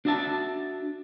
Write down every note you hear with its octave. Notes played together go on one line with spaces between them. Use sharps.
D4 F#4 D5 E5 A5